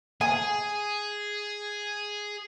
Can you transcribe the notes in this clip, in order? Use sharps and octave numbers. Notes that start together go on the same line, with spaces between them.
G#4 G#5